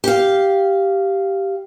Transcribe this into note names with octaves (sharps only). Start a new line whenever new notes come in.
G4 F5